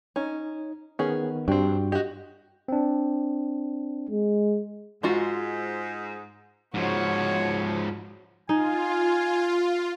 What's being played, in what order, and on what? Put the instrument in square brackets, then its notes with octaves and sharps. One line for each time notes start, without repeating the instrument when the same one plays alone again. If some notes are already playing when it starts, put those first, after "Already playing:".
[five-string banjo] C#4 [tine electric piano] D#4
[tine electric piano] D#3 B3 [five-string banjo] C#4 G#4
[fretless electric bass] G2 [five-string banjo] C4 D4 [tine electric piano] F#4 G5
[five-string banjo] F#4 G4 [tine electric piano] D#5
[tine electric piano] C4 D4
[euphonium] G#3
[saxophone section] G#2 [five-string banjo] G#3 F4 F#4
[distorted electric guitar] G#2 F3 [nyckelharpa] F#4 C#5
[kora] D#4 [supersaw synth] F4 [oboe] G#5